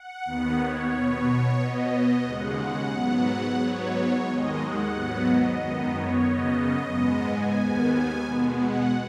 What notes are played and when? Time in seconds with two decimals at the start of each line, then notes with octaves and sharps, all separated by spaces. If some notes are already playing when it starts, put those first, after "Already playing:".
Already playing: F#5
0.25 D#2 D#3 B3
0.59 C#5
0.92 B2 B3
1.59 B2 B3 D#5
2.26 D#2 C#3 G#3 F#5
2.59 F#5
2.93 G#2 F#3 B3
3.59 G#2 F#3 B3 C#5
4.25 D#2 D#3 G#3 D#5
4.60 F#5
4.93 G#2 F#3 B3
5.25 D#5
5.59 F#2 D#3 B3
5.93 C#5
6.26 F#2 C#3 B3 D#5
6.58 D#5
6.92 G#2 G#3 B3
7.26 G#5
7.59 D#2 D#3 B3
7.92 G#5
8.25 B2 G#3 B3
8.59 F#5